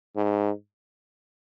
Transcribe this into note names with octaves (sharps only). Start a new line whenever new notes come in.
G#2